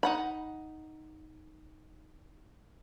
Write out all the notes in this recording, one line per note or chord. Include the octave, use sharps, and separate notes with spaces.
D#4 F#5 B5